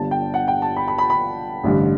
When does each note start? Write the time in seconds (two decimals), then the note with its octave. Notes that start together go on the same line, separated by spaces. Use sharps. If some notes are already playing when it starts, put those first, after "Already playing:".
Already playing: G1 G2 D3 A5
0.11 G5
0.34 F#5
0.48 G5
0.62 A5
0.76 B5
0.88 B5
0.98 B5
1.10 B5
1.64 A1 G2 D3